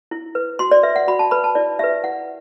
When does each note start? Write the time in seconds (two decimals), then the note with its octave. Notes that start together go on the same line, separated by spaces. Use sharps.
0.11 E4
0.35 B4
0.59 F#4 C6
0.71 D5
0.83 B4 E5
0.96 F#5
1.08 F#4 B5
1.19 A5
1.31 B4 B5
1.44 A5
1.55 E4 D5
1.79 G4 B4 E5
2.03 E4 F#5